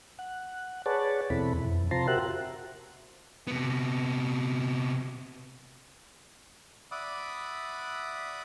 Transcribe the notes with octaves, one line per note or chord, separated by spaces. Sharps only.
F#5
G#4 B4 C#5 D5 F#5 A5
E2 B2 C4 E4 A4 B5
F2
C3 F4 C5 A5 A#5 C6
F#4 G4 A#4 C5 E5 F#6
C3 B3
D5 E5 F#5 B5 D6 D#6